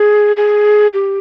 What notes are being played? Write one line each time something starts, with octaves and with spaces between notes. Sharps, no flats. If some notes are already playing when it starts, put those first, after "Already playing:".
Already playing: G#4
G#4
G4